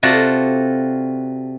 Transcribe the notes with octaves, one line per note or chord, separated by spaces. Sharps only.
C3 F4 F#4 A4 D5